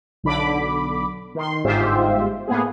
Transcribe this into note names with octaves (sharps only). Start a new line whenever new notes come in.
B1 D3 B5 D6
D#3 C6
G1 G#2 F4 G4 C5 E5
A2 A#3 B3 G#4